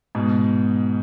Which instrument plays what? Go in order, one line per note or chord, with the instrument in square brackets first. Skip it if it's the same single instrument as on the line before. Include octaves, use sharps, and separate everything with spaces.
[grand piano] G#2 B2